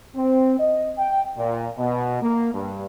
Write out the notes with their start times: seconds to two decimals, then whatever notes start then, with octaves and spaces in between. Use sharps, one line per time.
0.16 C4
0.59 D#5
0.98 G5
1.37 A#2
1.78 B2
2.22 A#3
2.53 G2